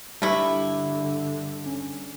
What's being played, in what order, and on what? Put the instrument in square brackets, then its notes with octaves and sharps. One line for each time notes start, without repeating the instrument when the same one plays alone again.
[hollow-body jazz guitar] G2 [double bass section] D3 [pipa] A3 E4 [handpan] G4 E5
[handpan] C#4